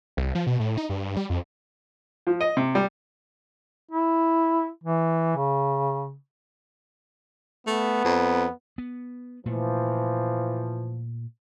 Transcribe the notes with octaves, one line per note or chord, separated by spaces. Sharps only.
C2
F3
B2
A2
D#4
G2
G3
F2
F3
D#5
C3
G3
E4
E3
C#3
A3 B3
F2
B3
A#2 E3 F3 A3